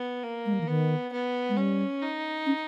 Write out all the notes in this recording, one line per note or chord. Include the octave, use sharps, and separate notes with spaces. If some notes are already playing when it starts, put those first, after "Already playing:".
Already playing: B3
A#3
G#3
G3
E3
D#3 B3
B3
G#3
G3 C#4
D#4
C#4